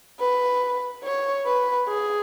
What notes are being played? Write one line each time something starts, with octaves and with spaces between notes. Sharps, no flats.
B4
C#5
B4
G#4